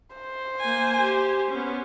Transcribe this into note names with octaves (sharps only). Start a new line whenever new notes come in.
C5
A#3 G#5
G4
B3 C#4